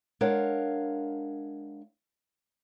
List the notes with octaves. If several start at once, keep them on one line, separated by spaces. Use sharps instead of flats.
G#3 D4 A#4 C#5 F5 F#5